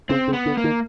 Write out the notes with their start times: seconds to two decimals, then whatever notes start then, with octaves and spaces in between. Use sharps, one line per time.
0.09 C#3 C4
0.28 C#3
0.33 B3
0.46 D3
0.57 A#3
0.64 D#3